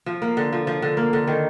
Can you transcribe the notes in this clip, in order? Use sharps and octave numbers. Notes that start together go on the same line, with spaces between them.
F3
A#3
D3
F3
F3
D3
A#3
D3
D#3